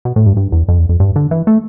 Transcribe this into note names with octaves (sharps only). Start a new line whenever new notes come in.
B2
A2
G2
G2
E2
F2
E2
F2
G2
D3
E3
A3